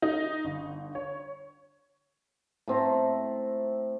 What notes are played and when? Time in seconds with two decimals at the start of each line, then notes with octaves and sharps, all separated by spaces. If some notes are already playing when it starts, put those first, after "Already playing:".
0.02 D#4
0.45 G1
0.95 C#5
2.68 A2 C4 A#5